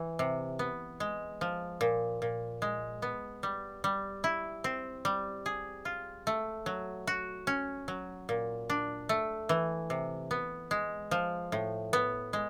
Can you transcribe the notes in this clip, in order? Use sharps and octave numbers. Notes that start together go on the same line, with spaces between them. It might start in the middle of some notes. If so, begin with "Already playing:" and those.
Already playing: E3
C3
B3
G#3
F3
A#2
A#2
G#3
B3
G3
G3
E4
C4
G3
G#4
F4
A3
F#3
F#4
C#4
F#3
A#2
D4
A3
E3
C3
B3
G#3
F3
A2
B3
G#3